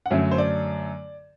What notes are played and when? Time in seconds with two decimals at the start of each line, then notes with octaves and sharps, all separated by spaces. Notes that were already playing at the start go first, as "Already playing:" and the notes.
0.06 F#5
0.10 F#2 D3 F#3 A3 E5
0.31 C5
0.38 D5